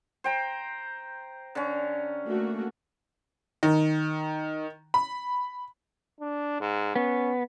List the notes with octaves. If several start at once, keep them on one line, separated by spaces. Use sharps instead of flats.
C5 G5 A#5
D3 C#4
A3 A#3 F#4
D#3
B5
D4
G#2
B3 C#4